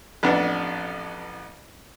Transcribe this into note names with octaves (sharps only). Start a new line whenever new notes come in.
A1 F2 B3 D4